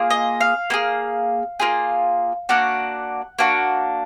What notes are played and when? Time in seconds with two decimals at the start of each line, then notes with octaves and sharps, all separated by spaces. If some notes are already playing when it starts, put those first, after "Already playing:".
Already playing: A#3 F4 G#4
0.10 D#5
0.41 F5
0.70 A#3 F4 G#4
1.60 A#3 F4 G#4
2.49 A#3 D4 F#4 F#5
3.39 A#3 D4 F#4